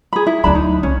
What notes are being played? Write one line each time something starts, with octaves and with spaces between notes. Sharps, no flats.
G#4 B5
E4
D2 F#3 D4 A5 B5
D#4
C2 C#4